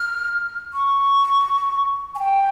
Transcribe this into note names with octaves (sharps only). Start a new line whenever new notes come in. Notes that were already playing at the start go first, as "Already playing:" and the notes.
Already playing: F6
C#6
G#5
G5